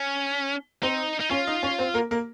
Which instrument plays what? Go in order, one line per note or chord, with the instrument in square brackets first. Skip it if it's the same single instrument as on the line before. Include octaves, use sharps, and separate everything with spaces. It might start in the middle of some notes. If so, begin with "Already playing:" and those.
Already playing: [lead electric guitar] C#4
[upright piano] C4 C5 [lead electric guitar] D#4
[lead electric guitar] D#4
[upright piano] C#4 C#5 [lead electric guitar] F4
[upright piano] D#4 D#5
C#4 C#5
C4 C5
A#3 A#4
A#3 A#4